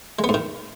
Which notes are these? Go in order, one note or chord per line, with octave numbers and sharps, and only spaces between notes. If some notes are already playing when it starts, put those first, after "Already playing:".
G#3
B3
G#2
D#3